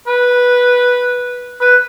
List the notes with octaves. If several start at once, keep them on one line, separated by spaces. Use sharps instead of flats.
B4
B4